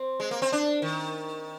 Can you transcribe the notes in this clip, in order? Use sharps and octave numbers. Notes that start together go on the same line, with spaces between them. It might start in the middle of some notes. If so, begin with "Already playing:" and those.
Already playing: C4
G#3
A#3
C4
D4
D#3